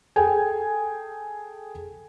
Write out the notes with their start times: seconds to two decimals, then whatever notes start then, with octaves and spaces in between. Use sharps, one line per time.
0.16 G#4 A4 G5 G#5